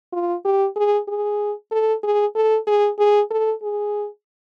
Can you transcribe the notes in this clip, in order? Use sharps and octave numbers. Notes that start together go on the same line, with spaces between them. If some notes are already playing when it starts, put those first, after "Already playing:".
F4
G4
G#4
G#4
A4
G#4
A4
G#4
G#4
A4
G#4